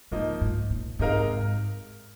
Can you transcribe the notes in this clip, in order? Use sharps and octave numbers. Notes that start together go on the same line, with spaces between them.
G#2 F3 A#3 D#4
G#2
A#2
G#2 C3 G#3 D#4 A#4 F5